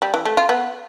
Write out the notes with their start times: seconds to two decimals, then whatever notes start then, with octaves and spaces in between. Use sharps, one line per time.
0.02 G3
0.14 E3
0.25 A3
0.37 F4
0.49 B3